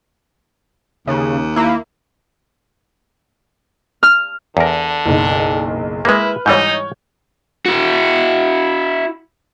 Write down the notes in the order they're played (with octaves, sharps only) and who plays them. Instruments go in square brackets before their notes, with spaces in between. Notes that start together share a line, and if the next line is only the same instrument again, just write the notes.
[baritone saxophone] D#2 [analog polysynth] C#3
[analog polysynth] A#3 E4
[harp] F6
[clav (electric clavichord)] E2 A#4 [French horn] D3
[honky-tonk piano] F#1 B1
[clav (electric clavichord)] G#3 A#3 [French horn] E4 [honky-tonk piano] B4 F6
[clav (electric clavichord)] G#2 E3 G3 [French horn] D#4 [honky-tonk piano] C#5 G6
[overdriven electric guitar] E4 F#4